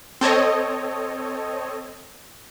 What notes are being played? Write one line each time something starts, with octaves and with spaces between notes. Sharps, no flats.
C4 A4 C#5 D#5